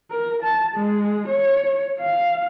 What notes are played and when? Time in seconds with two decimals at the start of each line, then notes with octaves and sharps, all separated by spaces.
0.11 A#4
0.43 A5
0.75 G#3
1.28 C#5
2.00 F5